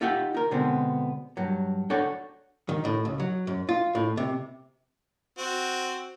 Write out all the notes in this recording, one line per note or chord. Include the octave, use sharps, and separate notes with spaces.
D#4 F4 G4 E5 F#5 G5
D#4 A#4
B2 D3 G#3 B3 C4
G2 F#3
D4 F#4 A4 C#5 F#5 G5
D#3
A2
C#2
F#3
F#2
F4
A2
C3
C4 F#4